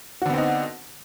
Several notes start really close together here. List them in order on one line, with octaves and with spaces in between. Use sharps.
F#4 D3 B3 C4 D#4